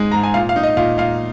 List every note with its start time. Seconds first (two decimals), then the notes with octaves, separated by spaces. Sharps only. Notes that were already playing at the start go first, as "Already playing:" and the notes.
Already playing: G#2 G#3 D#4 G#5
0.12 G#2 A#5
0.24 G#5
0.34 A#2 F5
0.49 F5
0.56 D#4
0.63 D#5
0.77 A#2 F5
0.98 A#2 F5